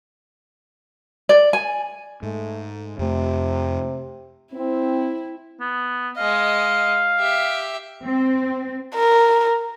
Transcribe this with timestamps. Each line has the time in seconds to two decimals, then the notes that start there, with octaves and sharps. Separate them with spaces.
1.29 D5
1.53 G#5
2.23 G#2 A3
2.99 F2 C3 A3
4.54 C4 E4
5.60 B3
6.17 G#3 D#5 F5
7.19 G4 E5
8.04 C4
8.95 A#4